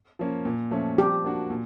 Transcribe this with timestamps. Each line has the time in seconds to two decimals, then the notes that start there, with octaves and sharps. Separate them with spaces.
0.19 F3 A#3 C#4
0.45 A#2
0.71 F3 A3 C#4
0.98 F3 G4
1.24 A#3 D4 F#4
1.50 A#2